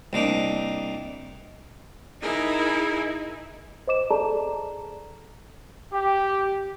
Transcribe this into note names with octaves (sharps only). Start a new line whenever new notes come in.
C2 A#3 D4 D#4
D#4 E4 G#4 A#4
C5 D#5 D6 E7
G#4 A4 D5 A5 A#5
G4